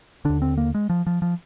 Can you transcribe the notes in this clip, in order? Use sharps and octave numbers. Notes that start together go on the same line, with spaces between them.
D#2 D3 D4
C4
A#3
G#3
F3
F3
F3